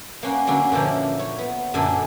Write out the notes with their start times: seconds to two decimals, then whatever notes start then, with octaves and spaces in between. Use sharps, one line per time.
0.23 A#3 C#4 F#5
0.47 D3 F#3 A#3 C#4
0.72 A#2 D3 E3 F3
1.19 C#5
1.38 B3
1.74 F#2 A#2 D3 A4 G#5